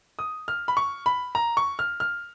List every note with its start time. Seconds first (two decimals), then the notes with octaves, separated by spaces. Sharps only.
0.19 D#6
0.48 F6
0.68 B5
0.77 C#6
1.06 B5
1.35 A#5
1.57 C#6
1.79 F6
2.00 F6